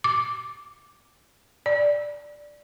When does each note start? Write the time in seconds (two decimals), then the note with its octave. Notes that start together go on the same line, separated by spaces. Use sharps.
0.04 D6
1.66 D5